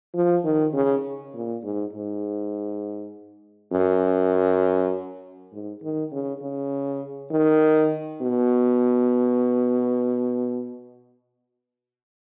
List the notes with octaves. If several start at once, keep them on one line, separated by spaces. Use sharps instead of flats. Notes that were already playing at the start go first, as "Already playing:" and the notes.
F3
D#3
C#3
A#2
G#2
G#2
F#2
G#2
D#3
C#3
C#3
D#3
B2